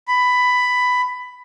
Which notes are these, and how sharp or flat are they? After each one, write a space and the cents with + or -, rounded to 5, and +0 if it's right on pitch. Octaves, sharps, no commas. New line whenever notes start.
B5 +10